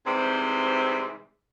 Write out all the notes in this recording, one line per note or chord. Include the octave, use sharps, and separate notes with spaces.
G#2 C3 E3 G3 C4